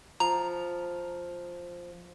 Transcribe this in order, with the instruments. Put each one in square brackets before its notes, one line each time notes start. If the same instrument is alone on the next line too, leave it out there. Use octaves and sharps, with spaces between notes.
[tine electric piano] F3 [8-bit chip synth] A#5